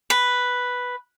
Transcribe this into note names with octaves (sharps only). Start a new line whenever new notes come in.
B4